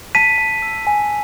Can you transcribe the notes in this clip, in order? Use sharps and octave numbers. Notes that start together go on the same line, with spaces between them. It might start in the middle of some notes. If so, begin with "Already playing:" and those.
A5 B6 D#7
A5
E6
G#5